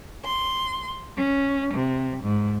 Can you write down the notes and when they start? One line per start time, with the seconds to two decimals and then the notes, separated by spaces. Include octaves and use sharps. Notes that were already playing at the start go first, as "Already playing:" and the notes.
0.24 C6
1.18 C#4
1.74 C3
2.24 G#2